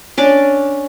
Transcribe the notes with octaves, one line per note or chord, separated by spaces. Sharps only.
C#4 D4 D5 D6